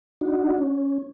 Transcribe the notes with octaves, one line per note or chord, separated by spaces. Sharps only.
D4 D#4 F#4
C#4